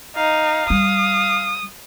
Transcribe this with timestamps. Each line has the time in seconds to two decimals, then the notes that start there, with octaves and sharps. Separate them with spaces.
0.16 D#4 F5
0.70 G3 D#6